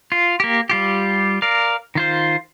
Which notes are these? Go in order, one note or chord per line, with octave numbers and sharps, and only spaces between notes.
F4
A#3 G4
G3 F4 G4
A#4 D5 F5
D#3 F4 C5